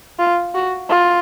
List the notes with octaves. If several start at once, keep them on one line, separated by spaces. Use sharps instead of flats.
F4
F#4
F4